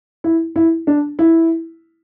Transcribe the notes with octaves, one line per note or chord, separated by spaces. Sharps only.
E4
E4
D4
E4